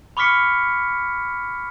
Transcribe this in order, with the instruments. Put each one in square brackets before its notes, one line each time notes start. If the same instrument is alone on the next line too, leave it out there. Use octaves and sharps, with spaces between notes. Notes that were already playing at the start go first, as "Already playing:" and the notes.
[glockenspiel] B5 C#6 D6 F6 B6 C#7